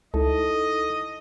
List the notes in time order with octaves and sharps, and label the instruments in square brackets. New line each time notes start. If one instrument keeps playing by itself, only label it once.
[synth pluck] C#2 [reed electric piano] D#4 E4 A4 [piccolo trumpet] D#5